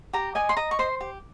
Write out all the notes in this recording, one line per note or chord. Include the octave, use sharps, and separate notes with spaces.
G4 A#5
D#5 G#5
C6
D#5 A#5
C#6
C5 C6
G4